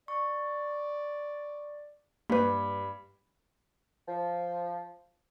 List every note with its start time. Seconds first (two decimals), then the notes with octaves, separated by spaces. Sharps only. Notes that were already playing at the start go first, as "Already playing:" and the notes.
0.08 D5 C#6
2.30 G2 A#3 B4 B5
4.07 F3